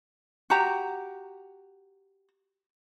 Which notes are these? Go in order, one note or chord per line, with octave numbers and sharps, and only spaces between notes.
F#4 G4 A#5